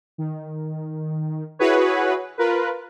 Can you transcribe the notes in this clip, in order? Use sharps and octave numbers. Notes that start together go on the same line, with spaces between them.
D#3
E4 F#4 G#4 B4 C#5
F4 A#4 B4